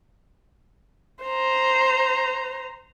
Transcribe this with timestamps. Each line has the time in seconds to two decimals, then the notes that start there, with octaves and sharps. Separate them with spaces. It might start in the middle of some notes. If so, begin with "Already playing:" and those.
1.24 C5 A#5